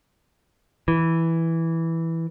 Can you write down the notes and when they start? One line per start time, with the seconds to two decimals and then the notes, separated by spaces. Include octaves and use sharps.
0.88 E3